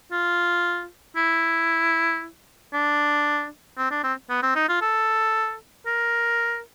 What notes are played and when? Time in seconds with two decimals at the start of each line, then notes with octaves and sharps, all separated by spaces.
0.12 F4
1.16 E4
2.73 D4
3.78 C4
3.91 D4
4.04 C4
4.30 B3
4.43 C4
4.56 D#4
4.69 F4
4.82 A4
5.87 A#4